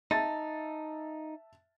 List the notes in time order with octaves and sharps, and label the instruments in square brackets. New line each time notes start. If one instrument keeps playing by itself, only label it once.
[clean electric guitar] D#4 [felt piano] E5 A5 A6